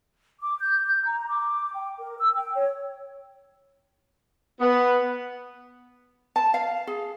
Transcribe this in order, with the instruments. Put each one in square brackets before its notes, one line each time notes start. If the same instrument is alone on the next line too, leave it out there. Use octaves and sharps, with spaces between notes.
[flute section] D6
G6
G6
A#5
D6
G5
A#4
E6
G5
C#5
[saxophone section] B3
[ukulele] A5
F5
G#4